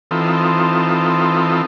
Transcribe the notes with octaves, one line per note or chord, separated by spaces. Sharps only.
E3 C4 D#4 F4 A4